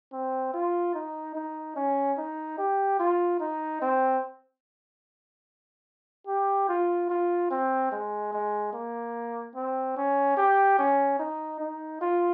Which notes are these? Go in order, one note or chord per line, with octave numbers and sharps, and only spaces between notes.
C4
F4
D#4
D#4
C#4
D#4
G4
F4
D#4
C4
G4
F4
F4
C4
G#3
G#3
A#3
C4
C#4
G4
C#4
D#4
D#4
F4